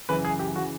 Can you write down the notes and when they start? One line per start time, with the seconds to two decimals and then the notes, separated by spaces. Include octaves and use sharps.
0.09 F#2 C#3 E3 B4
0.25 G#4
0.39 G4
0.56 C#3 E3 F#4